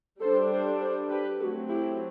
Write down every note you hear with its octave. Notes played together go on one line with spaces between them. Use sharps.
G3 D4 A4 C5
A4 C5
A4 C5
G4 B4
F#3 A3 C4 F#4 A4
E4 G4